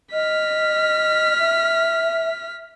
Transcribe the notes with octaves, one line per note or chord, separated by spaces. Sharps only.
D#5 F6 B6
E5